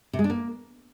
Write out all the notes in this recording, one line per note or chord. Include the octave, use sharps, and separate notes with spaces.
C3
G#3
D4
A#3